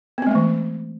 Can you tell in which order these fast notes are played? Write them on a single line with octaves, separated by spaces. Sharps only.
B3 C4 G#3 A3 E3